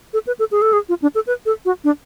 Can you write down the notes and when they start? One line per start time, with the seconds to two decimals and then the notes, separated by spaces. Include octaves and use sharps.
0.13 A4
0.27 B4
0.39 A4
0.51 G#4
0.62 A4
0.73 G#4
0.89 F4
1.02 D4
1.15 A4
1.27 B4
1.46 A4
1.65 F#4
1.84 D4